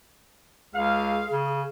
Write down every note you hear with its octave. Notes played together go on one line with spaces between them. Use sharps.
C#2 G#4 F5
C#3